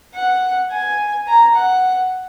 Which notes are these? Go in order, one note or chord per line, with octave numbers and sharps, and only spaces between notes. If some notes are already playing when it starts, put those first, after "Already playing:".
F#5
G#5
A#5
F#5